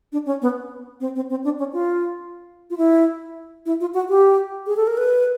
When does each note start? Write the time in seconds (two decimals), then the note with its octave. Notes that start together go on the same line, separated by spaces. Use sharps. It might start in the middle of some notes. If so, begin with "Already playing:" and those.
0.12 D4
0.26 C#4
0.42 B3
1.00 C4
1.15 C4
1.30 C4
1.44 D4
1.59 C#4
1.73 F4
2.70 F4
2.77 E4
3.66 E4
3.80 F4
3.94 F#4
4.09 G4
4.67 G#4
4.76 A4
4.87 A#4
4.97 B4